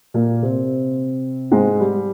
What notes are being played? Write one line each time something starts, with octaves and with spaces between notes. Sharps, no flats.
A#2 A#3
C3 C4
G#2 G#3
G3